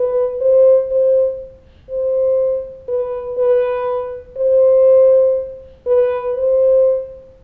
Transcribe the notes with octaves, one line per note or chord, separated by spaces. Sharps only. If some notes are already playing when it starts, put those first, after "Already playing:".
Already playing: B4
C5
C5
C5
B4
B4
C5
B4
C5